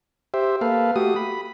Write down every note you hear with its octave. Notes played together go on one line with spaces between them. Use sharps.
G4 C5 E5
A#3 A4 B4 F5
A3 F#4 G4 D#6
B5